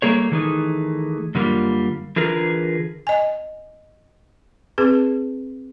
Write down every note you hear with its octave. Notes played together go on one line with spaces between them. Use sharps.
G3 A3 A#3 G#4 C#5
D#3 E3 A3 D#4 G#4
F#2 D3 G3 A#3 F4
D3 E3 F4 G#4 A#4 B4
D#5 G#5
C4 G#4 B4